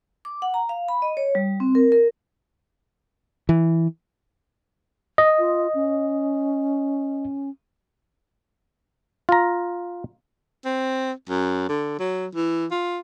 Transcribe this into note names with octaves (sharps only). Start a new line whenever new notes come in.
D6
F#5
A#5
F5
B5
D#5
C#5
G3
C4
A#4
A#4
E3
D#5
F4
C#4
F4 A#5
C4
F#2
D3
F#3
E3
F4